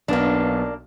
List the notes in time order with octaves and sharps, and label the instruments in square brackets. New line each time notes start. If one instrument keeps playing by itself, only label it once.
[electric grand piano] B1 B3 [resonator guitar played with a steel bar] A#3 D4